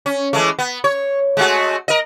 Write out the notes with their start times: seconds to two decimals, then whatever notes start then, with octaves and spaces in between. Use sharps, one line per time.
0.06 C#4
0.33 E3 G#3 A3
0.59 B3
0.84 C#5
1.37 G#3 A3 F#4
1.88 A#4 D#5